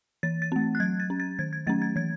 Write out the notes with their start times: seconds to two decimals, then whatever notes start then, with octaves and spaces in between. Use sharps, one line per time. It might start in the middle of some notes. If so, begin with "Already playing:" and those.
0.23 E3 A6
0.42 A6
0.52 A3 C4
0.75 F#6
0.80 F#3 G#6
1.00 A6
1.10 C#4
1.20 A6
1.39 D#3 G#6
1.53 G#6
1.67 F#3 A3 C#4 A6
1.82 G#6
1.96 E3 G#6